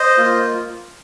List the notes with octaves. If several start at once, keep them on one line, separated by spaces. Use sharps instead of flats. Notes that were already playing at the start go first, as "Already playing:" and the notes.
Already playing: C5 D#5
A#3 F4